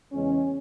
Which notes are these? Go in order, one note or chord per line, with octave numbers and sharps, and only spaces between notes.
E2 C#3 G#3 C#4